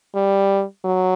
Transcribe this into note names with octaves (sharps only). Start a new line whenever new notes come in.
G3
F#3